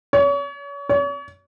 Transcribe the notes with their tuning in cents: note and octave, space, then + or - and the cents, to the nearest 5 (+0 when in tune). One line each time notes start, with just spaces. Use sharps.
C#5 +35
C#5 +40